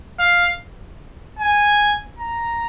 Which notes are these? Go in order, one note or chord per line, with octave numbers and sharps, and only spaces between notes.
F5
G#5
A#5